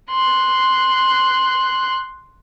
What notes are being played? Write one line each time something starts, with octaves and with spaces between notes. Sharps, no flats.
C6 F#6